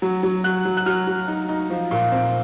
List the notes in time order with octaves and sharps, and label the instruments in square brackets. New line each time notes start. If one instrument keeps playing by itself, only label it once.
[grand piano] F#3
F#3
F#3 F#6
F#3
F#6
F#3 F6
F#3
D#4
D#4
F3
A#2
C4